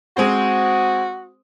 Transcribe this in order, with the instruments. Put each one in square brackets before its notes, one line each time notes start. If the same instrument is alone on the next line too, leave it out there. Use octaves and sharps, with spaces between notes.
[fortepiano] G#3 C4 C5 [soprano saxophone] F#4